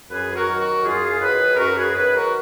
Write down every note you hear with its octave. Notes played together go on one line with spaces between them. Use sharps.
F#2 G#4 B4
F#4 A#4
D#3 F#3
F#4 A#4
F#2 F4 G#4
D#3 F#3 G#4 B4
G#4
F#2 F#4 A#4
G#4 B4
D#3 F#3 G#4 B4
F#4 A#4